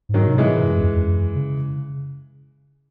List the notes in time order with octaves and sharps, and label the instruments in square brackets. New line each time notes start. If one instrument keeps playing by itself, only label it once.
[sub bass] G#2
[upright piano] D#3 F#3
[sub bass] C3
[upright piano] E3 G#3
[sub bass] A2
F#2
E2
F#2
C#3